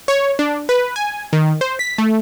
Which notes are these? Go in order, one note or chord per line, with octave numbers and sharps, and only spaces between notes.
C#5
D4
B4
G#5
D#3
C5
B6
A3